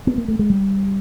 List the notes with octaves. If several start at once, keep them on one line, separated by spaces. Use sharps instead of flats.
B3
A#3
A3
G#3
G3